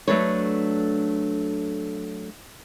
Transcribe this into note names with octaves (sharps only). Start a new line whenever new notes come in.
F#3 A3 D4 A4 B4 C#5